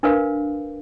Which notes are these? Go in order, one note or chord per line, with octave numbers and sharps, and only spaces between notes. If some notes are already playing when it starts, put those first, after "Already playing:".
D4 A#4 B4 F5